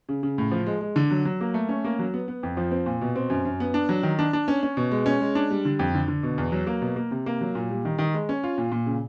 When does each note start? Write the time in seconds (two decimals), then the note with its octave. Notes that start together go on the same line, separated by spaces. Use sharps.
0.09 C#3
0.23 C#3
0.38 A2
0.51 F3
0.66 G#3
0.81 G#3
0.96 D3
1.11 F#3
1.25 F#3
1.41 A#3
1.54 A3
1.69 C#4
1.85 A#3
1.99 F#3
2.14 B3
2.28 B3
2.43 F2
2.57 F3
2.71 C4
2.86 A#2
3.01 B2
3.16 C4
3.30 F#2
3.45 F#2
3.60 B3
3.74 D4
3.89 F#3
4.03 D#3
4.19 D4
4.33 D4
4.48 C#4
4.63 C#4
4.77 B2
4.91 G#3
5.06 C#4
5.20 G#3
5.35 D4
5.50 G3
5.65 D3
5.79 F2
5.95 D3
6.08 D3
6.23 B2
6.38 E2
6.52 F#3
6.67 A#3
6.82 B2
6.96 A#3
7.11 C3
7.26 A#3
7.41 F#3
7.55 A#2
7.70 G3
7.85 D#3
7.99 D#3
8.14 G#3
8.29 C#4
8.43 F4
8.58 A#2
8.72 A#2
8.86 C#3